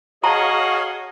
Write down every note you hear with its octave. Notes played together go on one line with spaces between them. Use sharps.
F#4 G#4 C#5 D#5 F5 A5 A#5